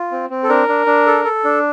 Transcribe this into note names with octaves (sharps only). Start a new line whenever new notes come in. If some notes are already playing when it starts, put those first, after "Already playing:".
Already playing: F4
C4
C4
A4
D4 A#4
D4
D4
A4
A4
D4